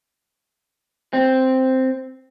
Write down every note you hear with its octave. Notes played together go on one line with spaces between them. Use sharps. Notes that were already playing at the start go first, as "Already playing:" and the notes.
C4